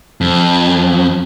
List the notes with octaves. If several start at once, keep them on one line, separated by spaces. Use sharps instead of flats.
F2